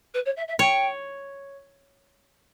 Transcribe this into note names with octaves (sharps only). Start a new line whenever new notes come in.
B4
C#5
E5
E5
C#5 G5